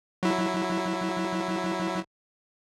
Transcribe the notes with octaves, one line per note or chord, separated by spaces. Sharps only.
F#3 E4